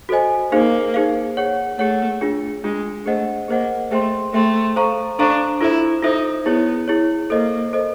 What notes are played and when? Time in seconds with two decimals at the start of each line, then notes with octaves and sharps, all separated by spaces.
0.09 F#4 A4 C5 D#5 G#5
0.52 A#3 D#4 G#4 C5 F5
0.94 D#4 G#4 C5 F5
1.37 G#4 C#5 F#5
1.78 A3 G#4 C#5 F#5
2.21 D4 F4 G#4
2.64 G#3 D4 F4 G#4
3.06 A3 G#4 C5 D#5 F#5
3.48 A#3 G#4 C5 D#5 F#5
3.91 A3 G#4 C5 E5 G5 C6
4.33 A3 G#4 C5 E5 G5 C6
4.76 A4 C5 F5 A#5 C#6
5.19 D4 A4 C5 F5 A#5 C#6
5.61 E4 F4 A4 C5 E5
6.03 D#4 F4 A4 C5 E5
6.45 B3 E4 G#4 C#5
6.88 E4 G#4 C#5
7.30 A#3 A4 C5 D#5
7.73 A4 C5 D#5